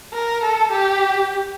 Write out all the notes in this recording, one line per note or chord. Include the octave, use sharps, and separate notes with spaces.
A#4
A4
G4